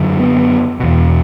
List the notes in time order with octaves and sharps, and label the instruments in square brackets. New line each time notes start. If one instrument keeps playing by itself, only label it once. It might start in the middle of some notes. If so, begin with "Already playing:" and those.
Already playing: [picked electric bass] F#2 D3
B3
E2 B2